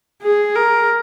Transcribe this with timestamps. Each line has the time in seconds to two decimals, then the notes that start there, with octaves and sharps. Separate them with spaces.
0.22 G#4
0.56 A#4